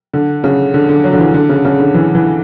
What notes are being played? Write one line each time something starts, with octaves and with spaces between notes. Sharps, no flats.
D3
C#3
D3
D3
F#3
D3
E3
D3
C#3
C#3
D3
E3
E3